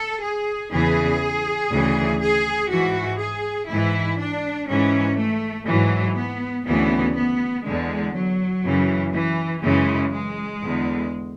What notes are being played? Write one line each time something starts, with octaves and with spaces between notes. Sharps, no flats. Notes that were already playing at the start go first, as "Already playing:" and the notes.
Already playing: A4
G#4
E2 C#3 E3 G#4
D2 C#3 E3
G#4
G#2 E3 F#4
G#4
G#2 E3 E4
D4
G#2 E3 C#4
A3
G#2 E3 F#3
B3
D2 C#3 E3 B3
B3
E2 D3 G#3
F#3
F#2 C#3 E3
E3
F#2 C#3 E3 G#3
G#3
E2 D3